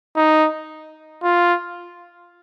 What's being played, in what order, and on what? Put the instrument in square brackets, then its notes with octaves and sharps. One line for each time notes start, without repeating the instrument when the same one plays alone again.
[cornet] D#4
F4